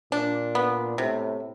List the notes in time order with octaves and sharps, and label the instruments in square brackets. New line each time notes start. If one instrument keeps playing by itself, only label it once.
[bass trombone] A#2 [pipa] D4
[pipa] B3
[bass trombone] A2 [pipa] C3